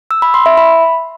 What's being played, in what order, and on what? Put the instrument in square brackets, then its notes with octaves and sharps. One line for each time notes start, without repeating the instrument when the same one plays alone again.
[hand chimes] E6
B5
C6
E5
B5